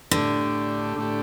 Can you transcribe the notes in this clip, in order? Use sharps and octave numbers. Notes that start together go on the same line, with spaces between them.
A2 D3 A3 D4 G4
A2 A3 D4 G4